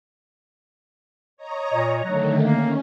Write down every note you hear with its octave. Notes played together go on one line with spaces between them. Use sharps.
C#5 D#5 A#5
A#2
D3 D#3 F#3 A3
A#3 C#4